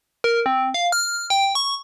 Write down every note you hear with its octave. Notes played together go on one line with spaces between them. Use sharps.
A#4
C4
F5
F6
G5
C#6